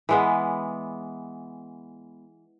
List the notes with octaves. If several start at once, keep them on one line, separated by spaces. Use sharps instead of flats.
E3 G#3 B3